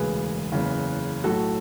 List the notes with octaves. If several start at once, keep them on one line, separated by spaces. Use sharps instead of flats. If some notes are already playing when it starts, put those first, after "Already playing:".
Already playing: E1 D2 C#3 G#4 B4
F#1 E2 C#3
B1 A2 F#3 F#4 A4